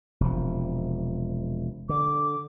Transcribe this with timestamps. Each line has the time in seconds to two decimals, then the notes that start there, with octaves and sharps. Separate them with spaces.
0.20 E1 C3 F3
1.89 D3 D6